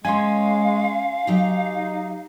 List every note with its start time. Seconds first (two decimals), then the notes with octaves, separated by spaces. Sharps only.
0.05 G#3 C#4 C#5 F5 G#5 C6
1.27 F#3 D#4 G4 A#5